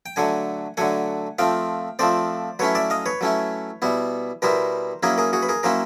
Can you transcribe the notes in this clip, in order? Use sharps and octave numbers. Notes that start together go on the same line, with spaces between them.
G5
D3 F#3 A3 F#5 G#5
D3 F#3 A3 F#5 G#5
F3 A3 C4 F5 G5
F3 A3 C4 C5 D5
F#3 A3 C#4 E4 B4 C#5
D5 E5
D#5 F5
B4 C#5
F#3 A3 C#4 E4
B2 G3 B3 E4
B2 G3 B3 E4 A#4 C5
F#3 A#3 C#4 E4 G#4 A#4
G#4 A#4
F#4 G#4
B4
G#4 A#4
F#3 A#3 C#4 E4 A#4 C5